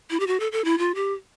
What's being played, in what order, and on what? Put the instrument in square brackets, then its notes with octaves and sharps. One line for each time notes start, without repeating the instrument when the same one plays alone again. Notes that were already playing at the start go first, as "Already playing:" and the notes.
[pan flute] E4
G4
F#4
A4
A4
E4
F4
G4